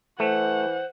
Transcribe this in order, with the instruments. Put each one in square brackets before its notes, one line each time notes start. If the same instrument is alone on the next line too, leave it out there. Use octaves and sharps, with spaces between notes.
[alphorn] E3 [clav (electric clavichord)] A3 [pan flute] C5 [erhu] F#5